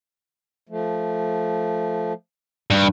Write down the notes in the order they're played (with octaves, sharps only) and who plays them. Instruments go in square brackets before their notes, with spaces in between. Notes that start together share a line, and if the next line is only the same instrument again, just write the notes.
[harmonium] F3 A3
[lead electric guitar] G2